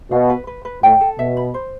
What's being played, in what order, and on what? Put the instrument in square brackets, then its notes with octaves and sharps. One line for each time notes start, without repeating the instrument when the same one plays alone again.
[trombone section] B2 [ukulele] F5
[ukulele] B4
B4
B4
[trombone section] A2 [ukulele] G5
[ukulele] A4
[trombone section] B2 [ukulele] E5
[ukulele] B5
C5